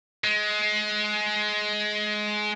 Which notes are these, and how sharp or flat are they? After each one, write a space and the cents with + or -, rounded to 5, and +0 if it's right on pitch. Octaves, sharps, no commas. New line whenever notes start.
G#3 +20